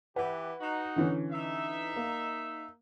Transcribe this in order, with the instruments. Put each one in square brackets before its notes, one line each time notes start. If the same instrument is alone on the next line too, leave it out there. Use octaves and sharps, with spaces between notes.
[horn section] E3 G4 [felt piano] B4 F#5
[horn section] D#4 F#4
[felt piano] D3 E3 C#4
[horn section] D#4 E5
[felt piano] A#3